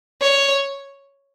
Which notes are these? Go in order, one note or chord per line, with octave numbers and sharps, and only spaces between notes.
C#5